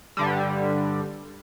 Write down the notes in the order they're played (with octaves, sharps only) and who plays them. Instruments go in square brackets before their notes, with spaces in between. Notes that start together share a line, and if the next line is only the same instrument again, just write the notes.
[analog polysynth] G2 D3 G3